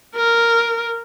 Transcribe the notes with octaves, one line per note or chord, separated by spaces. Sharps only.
A#4